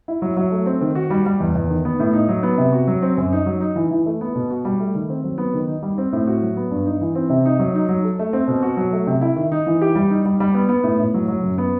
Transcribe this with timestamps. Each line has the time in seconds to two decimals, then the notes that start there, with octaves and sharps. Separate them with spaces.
0.08 E4
0.22 F#3
0.37 F#3
0.52 A3
0.66 C4
0.81 D#3
0.95 F#4
1.10 G3
1.26 G3
1.40 E2
1.55 E2
1.70 D#3
1.85 B3
2.00 A2
2.13 D#4
2.29 F#3
2.43 B3
2.58 C3
2.73 F#4
2.88 F#3
3.02 C4
3.17 F#2
3.33 D#4
3.46 F#3
3.61 D#4
3.76 E3
3.91 E3
4.06 A3
4.21 B3
4.35 B2
4.51 F#4
4.65 G3
4.80 A3
4.95 D#3
5.09 C4
5.24 F#3
5.38 B3
5.54 D#3
5.67 D#4
5.83 G3
5.98 C4
6.12 A2
6.27 F#4
6.42 F#3
6.57 B3
6.71 G2
6.86 D#4
7.01 E3
7.15 C4
7.30 C3
7.46 D#4
7.59 F#3
7.75 D#4
7.89 F#3
8.04 A4
8.19 A3
8.33 C4
8.48 B2
8.63 F#4
8.77 F#3
8.93 A3
9.07 C3
9.21 E4
9.36 D#3
9.52 D#4
9.67 E3
9.82 G4
9.95 G3
10.10 D#4
10.25 G3
10.40 G3
10.54 B3
10.69 B3
10.84 A2
11.00 A2
11.14 F#3
11.28 F#3
11.43 F#2
11.58 B3